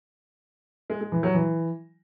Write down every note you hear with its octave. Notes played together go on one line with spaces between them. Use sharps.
G#3
G#3
E3
F#3
E3